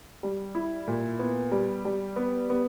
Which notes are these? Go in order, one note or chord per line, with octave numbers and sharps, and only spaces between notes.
G3
E4
A#2
B3
G3
G3
B3
B3